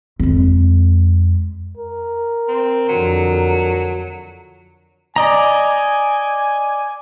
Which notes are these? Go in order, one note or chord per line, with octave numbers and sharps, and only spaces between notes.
F2 G#3
A#4
C4
F2 D3 F#3
D5 D#5 G#5 A#5